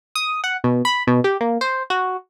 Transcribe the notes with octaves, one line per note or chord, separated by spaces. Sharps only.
D#6
F#5
B2
B5
B2
G4
A#3
C5
F#4